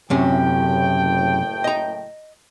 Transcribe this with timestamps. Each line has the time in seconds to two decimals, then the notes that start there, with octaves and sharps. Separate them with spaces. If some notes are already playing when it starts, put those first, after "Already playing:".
0.10 F#1 F#2 A2 C3 C#4 G5
1.64 D#5 A#5